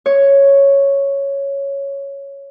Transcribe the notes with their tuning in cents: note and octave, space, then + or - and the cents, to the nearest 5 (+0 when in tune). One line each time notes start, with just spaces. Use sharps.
C#5 +0